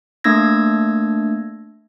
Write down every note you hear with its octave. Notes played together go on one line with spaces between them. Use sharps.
A3 A#3 D4 E6 G#6 A#6